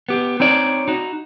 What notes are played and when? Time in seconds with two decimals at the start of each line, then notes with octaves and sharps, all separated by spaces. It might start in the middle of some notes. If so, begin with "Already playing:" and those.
0.09 B3 G4
0.40 C4 D#4 C#5 D5
0.88 D#4 F#4